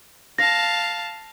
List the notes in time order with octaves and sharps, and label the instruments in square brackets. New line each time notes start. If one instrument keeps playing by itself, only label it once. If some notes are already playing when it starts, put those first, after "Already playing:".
[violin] F5 A5 [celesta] A#6